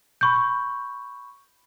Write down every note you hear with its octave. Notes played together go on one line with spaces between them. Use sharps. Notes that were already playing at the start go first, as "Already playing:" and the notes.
B5 C#6 G6